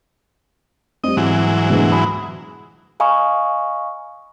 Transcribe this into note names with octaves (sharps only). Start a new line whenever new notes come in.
G3 C4 D#5
G#2 E3 F#3
D2 B2 G#3
B5 D#6
D#5 F5 G#5 B5 C#6 D#6